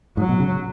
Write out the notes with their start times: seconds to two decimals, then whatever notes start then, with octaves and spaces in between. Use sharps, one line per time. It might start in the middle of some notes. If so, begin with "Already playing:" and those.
0.17 G#2 F#3
0.29 B2
0.40 C#3